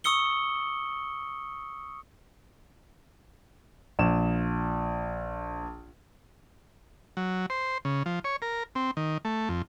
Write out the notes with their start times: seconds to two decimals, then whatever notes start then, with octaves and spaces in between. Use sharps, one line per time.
0.04 C#6 D#6 E6 C#7 G7
3.99 A#1 E7
7.17 F#3
7.50 C5
7.85 C#3
8.06 F3
8.24 C#5
8.42 A#4
8.75 C4
8.97 D#3
9.25 A3
9.49 F2